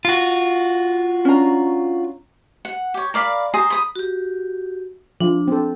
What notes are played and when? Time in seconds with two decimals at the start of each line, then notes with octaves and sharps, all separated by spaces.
0.05 F4 F#4
1.25 C#4 D4 A#5
2.65 F#5
2.94 G4 C#5
3.14 A#4 D5 F5 B5
3.54 G#4 C5 A#5 C6
3.70 B5 D#6
3.96 F#4 G4
5.21 F3 D4
5.48 C4 A4